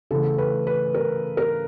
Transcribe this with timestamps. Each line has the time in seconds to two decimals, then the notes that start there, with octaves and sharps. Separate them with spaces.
0.11 C#3 E3 A3 A4
0.38 B4
0.67 B4
0.94 A#4
1.37 A#4